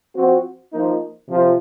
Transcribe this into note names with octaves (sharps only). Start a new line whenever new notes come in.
F3 C4 F#4
F3 A#3 D#4
C3 F3